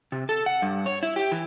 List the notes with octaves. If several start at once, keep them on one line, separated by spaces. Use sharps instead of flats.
C3
A4
F#5
G2
C#5
E4
G4
E3